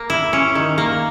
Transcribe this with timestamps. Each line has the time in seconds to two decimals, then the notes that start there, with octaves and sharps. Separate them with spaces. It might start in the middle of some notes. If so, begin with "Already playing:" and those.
Already playing: A#3
0.10 E4
0.33 C#4
0.55 D#3
0.78 A#3